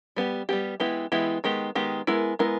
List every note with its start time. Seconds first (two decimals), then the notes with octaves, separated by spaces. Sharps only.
0.16 G3 B3 G4
0.49 G3 B3 G4
0.80 E3 G#3 B3 E4 G4
1.12 E3 G#3 B3 E4 G4
1.44 D#3 G#3 B3 G4
1.75 D#3 G#3 B3 G4
2.07 G#3 B3 E4 A#4
2.39 G#3 B3 E4 A#4